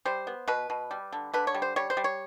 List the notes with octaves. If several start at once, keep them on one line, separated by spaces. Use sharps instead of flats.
G3 C5
B3
B2 B4
B2
G3
D3
D3 B4
C#5
G3
C5
G3 C#5
C5
G3
C#5